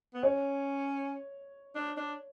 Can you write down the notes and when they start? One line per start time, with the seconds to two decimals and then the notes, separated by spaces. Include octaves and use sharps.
0.14 B3
0.23 C#4 C#5
1.75 D4
1.97 D4